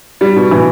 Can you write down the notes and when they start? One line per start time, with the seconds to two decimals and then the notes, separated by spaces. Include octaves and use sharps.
0.21 G3
0.36 B2
0.51 E3